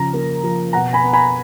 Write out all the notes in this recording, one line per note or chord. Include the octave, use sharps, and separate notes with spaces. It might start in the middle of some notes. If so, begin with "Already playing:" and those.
Already playing: C#3 F3 A#5
A#3
F3
B2 F#5 A#5
G#5 B5
B3
G#5 B5